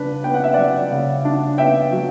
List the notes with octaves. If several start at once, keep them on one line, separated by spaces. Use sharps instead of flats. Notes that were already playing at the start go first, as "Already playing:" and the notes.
Already playing: C#3 D4 B4 D5
B3 G5
F#5
E5
F#3 D5 F#5
C#3
D4
B3 E5 G5
F#3